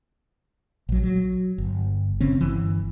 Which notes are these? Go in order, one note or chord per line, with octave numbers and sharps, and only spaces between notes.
A#1 F#3
F#3
G1
F#1 C#3 C4 C#4
G1 E3